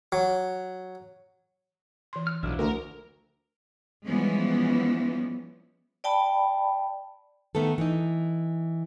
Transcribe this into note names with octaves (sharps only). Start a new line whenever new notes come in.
F#3
E3 C6
F6
B1 F3 D4 E4
D2 A#4
E3 F3 G3 G#3 B3 C#4
D5 G5 A5 B5
D#3 A3 B3 A4
E3 D#4